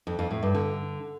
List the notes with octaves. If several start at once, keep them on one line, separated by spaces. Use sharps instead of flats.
F2
F2
A2
G2
D3